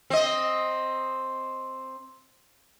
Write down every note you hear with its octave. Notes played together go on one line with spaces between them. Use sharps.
C4 D#5